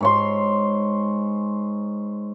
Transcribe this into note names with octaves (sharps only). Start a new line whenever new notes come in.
G#2 C#5 C6